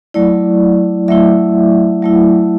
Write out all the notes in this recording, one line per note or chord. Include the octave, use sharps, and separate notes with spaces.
F#3 A3 E4 D5
F#3 A3 E4 E5
F#3 A3 E4